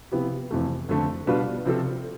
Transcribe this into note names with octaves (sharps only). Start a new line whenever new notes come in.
C3 F3 B3 E4 G4
F2 C3 E3 A3
F2 D3 A3 C4
B2 G3 D4 F4 B4
C3 F3 C4 F4 A4